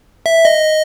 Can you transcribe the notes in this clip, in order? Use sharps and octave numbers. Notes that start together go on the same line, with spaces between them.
E5
D#5